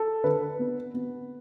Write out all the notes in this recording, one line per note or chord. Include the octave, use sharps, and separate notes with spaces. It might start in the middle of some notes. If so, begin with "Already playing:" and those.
Already playing: A4
D3 B4
B3
B3